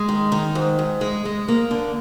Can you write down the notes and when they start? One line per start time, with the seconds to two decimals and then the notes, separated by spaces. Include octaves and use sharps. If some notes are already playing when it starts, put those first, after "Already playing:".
Already playing: G#3
0.09 D#3
0.32 D#3
0.55 G#2
0.79 G#2
1.01 G#3
1.25 G#3
1.48 A#3
1.71 D3